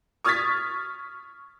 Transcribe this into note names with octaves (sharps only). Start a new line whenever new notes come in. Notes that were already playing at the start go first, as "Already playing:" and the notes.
C#6 D#6 F6 G#6 A6 B6